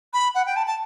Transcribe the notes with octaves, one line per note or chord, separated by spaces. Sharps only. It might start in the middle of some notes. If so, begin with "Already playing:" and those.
B5
F#5
G5
A5
A5